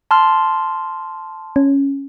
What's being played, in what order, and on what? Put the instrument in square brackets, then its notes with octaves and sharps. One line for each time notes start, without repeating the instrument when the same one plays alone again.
[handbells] A5 C6 F6
[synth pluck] C#4